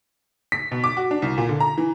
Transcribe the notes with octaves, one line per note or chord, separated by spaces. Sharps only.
B6
B2
D6
F#4
D4
C2
A#2
D3
A#5
E3